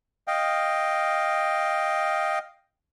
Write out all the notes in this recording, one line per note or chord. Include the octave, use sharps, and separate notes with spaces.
D#5 F5 G5